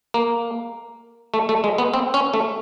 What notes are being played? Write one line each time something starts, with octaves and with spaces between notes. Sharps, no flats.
A#3
A3
A3
G#3
B3
C4
C#4
A3